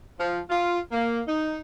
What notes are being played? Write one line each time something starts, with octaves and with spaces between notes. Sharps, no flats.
F3
F4
A#3
D#4